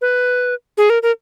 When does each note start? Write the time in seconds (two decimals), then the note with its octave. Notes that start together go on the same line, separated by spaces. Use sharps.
0.01 B4
0.78 G#4
0.90 A#4
1.03 A#4